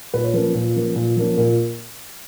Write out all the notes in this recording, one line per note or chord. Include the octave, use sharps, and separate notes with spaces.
A#2 B4
C#5
F3 A#3 C#4 B4
A#2
F3 A#3 C#4
A#2
F3 A#3 C#4
A#2 A#4